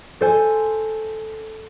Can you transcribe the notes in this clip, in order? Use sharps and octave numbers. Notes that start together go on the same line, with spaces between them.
A4 C5 G#5